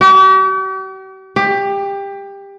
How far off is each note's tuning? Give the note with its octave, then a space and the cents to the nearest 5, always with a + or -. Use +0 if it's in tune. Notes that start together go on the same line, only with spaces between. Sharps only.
G4 -45
G4 +20